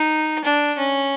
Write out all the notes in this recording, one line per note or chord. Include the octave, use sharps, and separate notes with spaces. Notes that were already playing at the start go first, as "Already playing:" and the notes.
Already playing: D#4
D4
C#4